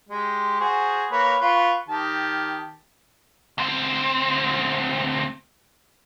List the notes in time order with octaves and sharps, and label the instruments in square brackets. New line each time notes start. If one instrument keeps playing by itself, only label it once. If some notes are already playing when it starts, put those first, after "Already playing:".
[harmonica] G#3 G4
F#4 G#4 C5
A#3 B4 C#5
F4 B4 C#6
D#3 G4 A5
[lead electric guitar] D2 C4